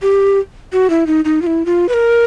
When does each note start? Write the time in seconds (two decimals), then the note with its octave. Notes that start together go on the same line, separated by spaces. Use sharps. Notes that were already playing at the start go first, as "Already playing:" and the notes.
0.02 G4
0.73 F#4
0.90 E4
1.07 D#4
1.25 D#4
1.42 F4
1.47 E4
1.66 F4
1.89 B4
1.94 A#4